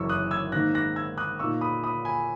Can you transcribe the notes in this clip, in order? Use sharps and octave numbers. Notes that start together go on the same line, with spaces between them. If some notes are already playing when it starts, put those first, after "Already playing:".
Already playing: F#1 F#2 E3 C#6 E6
D#6 F#6
E6 G#6
G#2 D#3 A#3 D#4 F#6 A#6
F#6 A#6
E6 G#6
D#6 F#6
A#2 A#3 D#4 C#6 E6
B5 D#6
B5 D#6
G#5 B5